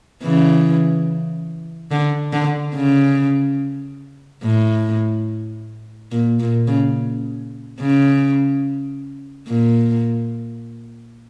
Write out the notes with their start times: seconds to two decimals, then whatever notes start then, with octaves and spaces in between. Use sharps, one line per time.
0.23 C#3 E3
1.91 D3
2.33 D3
2.75 C#3
4.43 A2
6.12 A#2
6.40 A#2
6.67 C#3
7.80 C#3
9.47 A#2